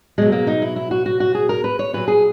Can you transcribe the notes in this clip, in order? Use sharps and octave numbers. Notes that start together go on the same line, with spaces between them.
B2 F#3 G#3
A#3
D#4
E4
E4
F#4
F#4
F#4
G#4
A#4
B4
C#5
A#2 F#3 B4
G#4